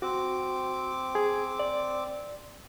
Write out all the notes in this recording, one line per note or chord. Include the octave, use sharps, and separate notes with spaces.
C4 F#4 D6
G#4
D5